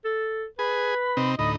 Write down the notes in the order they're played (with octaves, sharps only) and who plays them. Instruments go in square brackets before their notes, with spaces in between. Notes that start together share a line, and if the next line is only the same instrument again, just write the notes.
[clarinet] A4
[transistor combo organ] G#4 [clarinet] B4 [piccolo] B5
[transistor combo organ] C3 C4 D#4
[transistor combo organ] D2 A2 D#4 [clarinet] D#5 [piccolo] B5